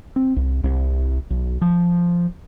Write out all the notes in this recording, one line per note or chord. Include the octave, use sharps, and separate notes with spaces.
C4
C2
C2
B1
F3